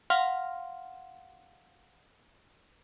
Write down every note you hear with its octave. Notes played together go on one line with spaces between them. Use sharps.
F5 F#5 C6 F6